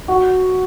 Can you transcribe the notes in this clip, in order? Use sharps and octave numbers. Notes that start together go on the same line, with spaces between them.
F#4